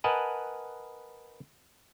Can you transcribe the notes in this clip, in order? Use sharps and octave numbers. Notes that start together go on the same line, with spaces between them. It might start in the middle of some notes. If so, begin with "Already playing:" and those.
A#4 B4 D#5 F#5 G#5 A5